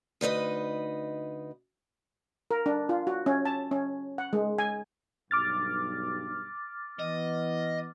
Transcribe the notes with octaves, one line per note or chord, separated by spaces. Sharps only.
D2 D#4 B4 D#5
A#4
D4
F4
F#4
C#4
A5
C#4
F#5
G#3
G#5
B1 G2 D6 F6 A6
E3 B3 D#5